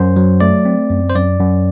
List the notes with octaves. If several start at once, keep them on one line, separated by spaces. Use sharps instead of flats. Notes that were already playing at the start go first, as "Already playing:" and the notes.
Already playing: F#2 C5
F#3
A3 D5
C4
F#2
C5
F#2 D5
F#2